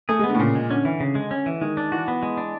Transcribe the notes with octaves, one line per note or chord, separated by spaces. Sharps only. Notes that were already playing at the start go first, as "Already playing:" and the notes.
A3 G#4
G#3 B3
D3
A2
A#2 C#3
G#3
D3 C#4
E3
C#3
G#3
C#4
E3
D#3 G#3
D4
E3 F#4
B3
G#3
D4